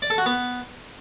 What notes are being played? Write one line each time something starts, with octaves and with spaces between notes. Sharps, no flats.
D5
A4
F#4
B3